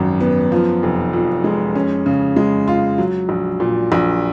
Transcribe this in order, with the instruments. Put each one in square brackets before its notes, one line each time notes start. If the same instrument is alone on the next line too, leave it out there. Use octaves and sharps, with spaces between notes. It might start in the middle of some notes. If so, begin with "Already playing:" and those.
Already playing: [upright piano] G#1 F#2 F3
B3
F3
F1
F2
G#3
C#4
C#3
G#3
F4
F#3
A#1
A#2
A#1